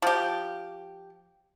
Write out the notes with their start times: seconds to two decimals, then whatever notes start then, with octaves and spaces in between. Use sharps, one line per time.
0.02 F3 G4